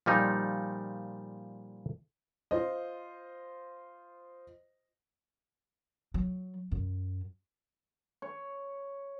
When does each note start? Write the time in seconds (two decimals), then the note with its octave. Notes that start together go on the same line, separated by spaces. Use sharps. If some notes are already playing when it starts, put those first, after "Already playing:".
0.06 A#2 F3 G3 D#4
2.51 F4 C5 D#5
6.14 F#3
6.71 F#2
8.22 C#5